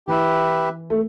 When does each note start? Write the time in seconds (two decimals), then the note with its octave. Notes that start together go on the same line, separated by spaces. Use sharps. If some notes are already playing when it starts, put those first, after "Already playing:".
0.07 E3 G4 B4 E5
0.90 A3